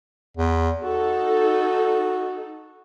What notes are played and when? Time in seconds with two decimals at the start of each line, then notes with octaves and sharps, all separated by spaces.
0.37 E2
0.83 D#4 F#4 A4